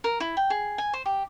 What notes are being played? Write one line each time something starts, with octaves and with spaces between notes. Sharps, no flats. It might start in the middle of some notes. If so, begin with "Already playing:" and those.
A#4
E4
G5
G#4
G#5
C5
G4